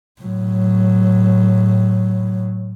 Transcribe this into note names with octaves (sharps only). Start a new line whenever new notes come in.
A2 F#3